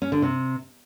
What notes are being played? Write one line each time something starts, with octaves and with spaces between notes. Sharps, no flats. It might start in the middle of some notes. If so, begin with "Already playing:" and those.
C#4
D3
C3